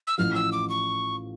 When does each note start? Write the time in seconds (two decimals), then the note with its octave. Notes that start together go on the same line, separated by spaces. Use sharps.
0.07 E6
0.18 A1 A2 F3 F6
0.35 E6
0.52 D6
0.70 C#6